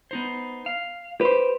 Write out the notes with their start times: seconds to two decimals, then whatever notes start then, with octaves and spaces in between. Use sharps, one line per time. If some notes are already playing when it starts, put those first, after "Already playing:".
0.11 B3 D#4 C5
0.66 F5
1.21 G4 B4 C5